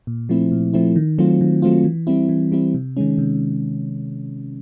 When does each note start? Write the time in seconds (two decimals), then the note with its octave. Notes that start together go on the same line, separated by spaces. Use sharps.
0.07 A#2
0.29 F3 A3 C4 E4
0.52 A#2
0.73 F3 A3 C4 E4
0.96 D#3
1.19 F#3 A3 C4 F4
1.41 D#3
1.62 F#3 A3 C4 F4
1.84 E3
2.07 G3 C4 E4
2.29 E3
2.52 G3 C4 E4
2.74 C3
2.97 D#3 G#3 C#4
3.18 C3